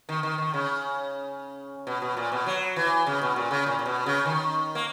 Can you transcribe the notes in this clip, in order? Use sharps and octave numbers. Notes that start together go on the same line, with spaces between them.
D#3
D#3
D#3
C#3
B2
B2
A#2
B2
F#3
E3
C#3
B2
A#2
C#3
A#2
A#2
B2
C#3
D#3
A#3